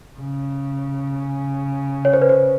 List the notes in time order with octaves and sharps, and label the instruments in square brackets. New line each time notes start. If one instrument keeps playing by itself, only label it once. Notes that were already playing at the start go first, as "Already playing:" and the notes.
[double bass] C#3
[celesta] C#5
C5
B4
C5